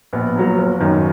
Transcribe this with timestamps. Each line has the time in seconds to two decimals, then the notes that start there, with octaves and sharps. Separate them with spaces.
0.13 A#1 B3
0.36 A#2 F#3
0.58 F#1
0.80 F#2 D#3